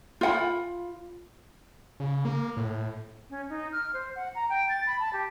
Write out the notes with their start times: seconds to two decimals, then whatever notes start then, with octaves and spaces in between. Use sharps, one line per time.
0.21 F4 F#5 B5
2.00 C#3
2.25 A#3
2.57 A2
3.30 C#4
3.49 D#4
3.72 F6
3.93 C5
4.15 F#5
4.35 A#5
4.50 G5
4.69 A6
4.86 B5
5.00 A5
5.13 G4